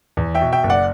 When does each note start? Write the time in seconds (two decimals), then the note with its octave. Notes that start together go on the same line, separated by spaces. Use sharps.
0.17 E2
0.35 E5 G5
0.41 B2
0.52 E5 G5
0.64 F#1
0.70 D5 F#5